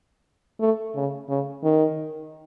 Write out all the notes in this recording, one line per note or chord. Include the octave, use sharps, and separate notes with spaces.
A3
C#3
C#3
D#3